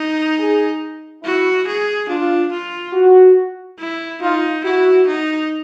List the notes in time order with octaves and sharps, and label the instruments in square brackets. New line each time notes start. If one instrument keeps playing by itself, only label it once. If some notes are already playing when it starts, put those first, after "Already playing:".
Already playing: [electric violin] D#4
[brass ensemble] G#4
[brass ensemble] E4 [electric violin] F#4
[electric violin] G#4
[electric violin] D4 [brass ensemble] F4
[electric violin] F4
[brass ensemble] F#4
[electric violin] E4
[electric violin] D#4 [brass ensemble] F4
[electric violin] E4 [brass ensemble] F#4
[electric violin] D#4